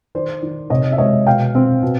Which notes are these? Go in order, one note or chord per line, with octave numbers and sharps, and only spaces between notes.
D#3 C5 D5
D#3
C3 C#5 D#5
E5
G#3 C#5 D#5
B2 F5 G5
C4
B2